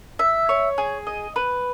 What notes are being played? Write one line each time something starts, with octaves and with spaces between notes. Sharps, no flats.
E5
C#5
G#4
D#5
B4